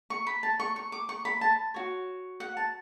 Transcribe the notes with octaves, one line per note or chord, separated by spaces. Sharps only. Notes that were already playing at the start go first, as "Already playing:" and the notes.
C#6
B5
A5
C#6
C#6
D6
C#6
B5
A5
F#4 C#5
F#5
A5